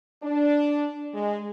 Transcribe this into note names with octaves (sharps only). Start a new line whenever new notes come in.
D4
G#3